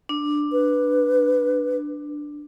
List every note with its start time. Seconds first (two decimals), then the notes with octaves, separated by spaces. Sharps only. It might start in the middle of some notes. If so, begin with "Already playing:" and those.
0.09 D4
0.52 B4